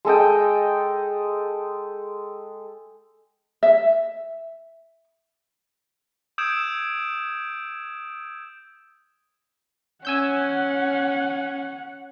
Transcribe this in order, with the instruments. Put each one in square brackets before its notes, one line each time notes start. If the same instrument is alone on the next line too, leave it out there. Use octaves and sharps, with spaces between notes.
[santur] G#3 A4 D#5 G5
[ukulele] E5
[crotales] D#6 E6 G6 G#6 D7 E7
[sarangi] C#4 [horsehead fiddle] F#5 [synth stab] G#5 E6 G6